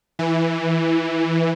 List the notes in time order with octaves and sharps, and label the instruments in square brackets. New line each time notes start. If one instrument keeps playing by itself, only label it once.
[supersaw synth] E3